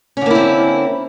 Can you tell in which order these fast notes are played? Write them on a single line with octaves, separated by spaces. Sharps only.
C#4 D3 A#3 E4 C4